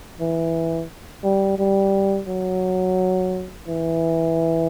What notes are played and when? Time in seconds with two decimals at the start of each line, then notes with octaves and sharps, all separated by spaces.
0.20 E3
1.24 G3
1.58 G3
2.28 F#3
3.68 E3